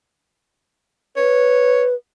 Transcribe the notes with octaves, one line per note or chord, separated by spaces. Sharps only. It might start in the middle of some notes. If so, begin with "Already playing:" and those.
B4 C#5